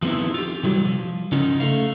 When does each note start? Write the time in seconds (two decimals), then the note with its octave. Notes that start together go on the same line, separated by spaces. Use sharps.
0.02 F3 A3 B3 C4 D#4 E4
0.34 F4 G4
0.63 C3 E3 F#3 G3
0.85 F3
1.32 C#3 C#4 D#4 F4
1.60 A3 F5